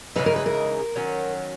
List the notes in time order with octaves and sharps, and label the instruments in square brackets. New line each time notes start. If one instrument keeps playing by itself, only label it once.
[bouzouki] C#3 E3 G#3 D#4 [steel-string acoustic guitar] B4
[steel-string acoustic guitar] A#4
B4
A#4
[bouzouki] D#3 F#3 C#4